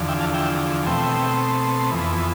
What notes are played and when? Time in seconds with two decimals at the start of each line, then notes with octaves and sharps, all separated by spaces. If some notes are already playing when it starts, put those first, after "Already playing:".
Already playing: E2 D3 F3
0.08 E5 G5
0.21 F5 A5
0.33 E5 G5
0.86 B2 A3 C4 E5 G5
1.90 F2 E3 B3